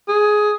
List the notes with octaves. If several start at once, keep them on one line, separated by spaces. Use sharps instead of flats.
G#4